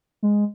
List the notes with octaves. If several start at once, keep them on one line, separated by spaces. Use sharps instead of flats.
G#3